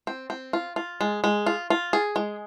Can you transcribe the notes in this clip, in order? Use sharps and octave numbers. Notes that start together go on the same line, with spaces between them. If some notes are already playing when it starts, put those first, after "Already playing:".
C4
C4
F4
F4
G#3
G#3
F4
F4
G#4
G#3